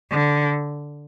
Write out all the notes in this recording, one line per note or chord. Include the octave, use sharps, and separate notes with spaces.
D3